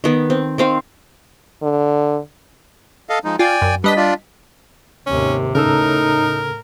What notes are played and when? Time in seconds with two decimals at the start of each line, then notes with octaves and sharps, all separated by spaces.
0.04 D#3 B3
0.30 C4
0.58 D#3 C4 F5
1.63 D3
3.09 A4 D#5 F5
3.24 F3 G#3 D#4
3.39 F4 D5 G5 G#5
3.62 F#2
3.84 G3 D4 B4 D#5 B6
3.96 D4 F4 D5
5.07 D#2 G#2 C3 C#4
5.55 A2 C#3 D#4 A4 A#4 E6